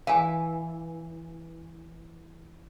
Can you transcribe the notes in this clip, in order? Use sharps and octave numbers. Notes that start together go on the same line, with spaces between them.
E3 F5 G#5